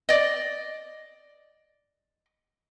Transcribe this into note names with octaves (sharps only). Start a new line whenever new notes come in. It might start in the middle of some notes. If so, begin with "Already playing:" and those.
D5 D#5